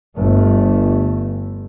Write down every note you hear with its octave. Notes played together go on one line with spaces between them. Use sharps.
G1 A3